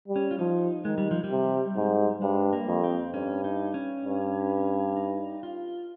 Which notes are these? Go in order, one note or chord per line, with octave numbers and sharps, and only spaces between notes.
G3
C#4
F4
F3 D#4
D#3 G#3
G3
F3
G3
C3
G#2
G2 G#3
A#3
F2
C4
G2 C#4
D#4
C#4
G2
D#4
F4